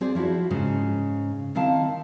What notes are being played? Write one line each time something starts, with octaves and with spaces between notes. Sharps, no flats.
C4 G#4 D5
F3 E4 F#4
G#2 C#3
D#3 C4 E4 F5 A5